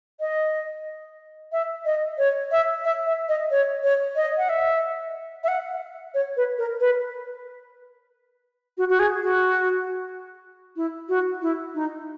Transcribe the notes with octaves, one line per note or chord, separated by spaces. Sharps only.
D#5
E5
D#5
C#5
E5
E5
E5
D#5
C#5
C#5
D#5
F#5
E5
E5
F#5
C#5
B4
A#4
B4
F#4
F#4
G#4
F#4
E4
F#4
E4
D#4